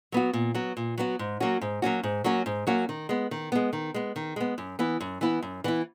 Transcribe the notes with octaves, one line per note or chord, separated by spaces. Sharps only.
F#3 B3 F#4
A#2
F#3 B3 F#4
A#2
F#3 B3 F#4
G#2
F#3 A#3 C#4 F#4
G#2
F#3 A#3 C#4 F#4
G#2
F#3 A#3 C#4 F#4
G#2
F#3 A#3 C#4 F#4
D#3
G#3 B3
D#3
G#3 B3
D#3
G#3 B3
D#3
G#3 B3
F#2
E3 B3 E4
F#2
E3 B3 E4
F#2
E3 B3 E4